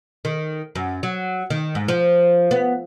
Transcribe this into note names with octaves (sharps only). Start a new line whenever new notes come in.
D#3
F#2
F#3
D#3
G#2
F3
B3